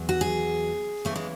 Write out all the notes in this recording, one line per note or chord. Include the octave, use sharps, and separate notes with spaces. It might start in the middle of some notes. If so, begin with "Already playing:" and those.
Already playing: E2 F#3
F#4
G#4
E2 C#3 E3 A3
G#3